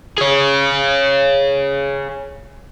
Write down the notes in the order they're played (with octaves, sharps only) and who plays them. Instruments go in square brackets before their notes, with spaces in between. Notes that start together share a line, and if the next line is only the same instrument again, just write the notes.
[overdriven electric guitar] G#4 C#5